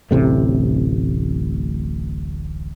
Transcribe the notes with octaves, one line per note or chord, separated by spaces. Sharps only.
D1 A1 C3 A3